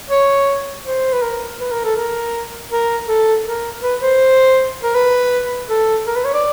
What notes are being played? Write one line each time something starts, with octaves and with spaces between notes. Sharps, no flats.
C#5
C5
B4
A#4
B4
A#4
A4
A#4
A#4
A4
A#4
B4
C5
A#4
B4
A4
A#4
B4
C#5
D5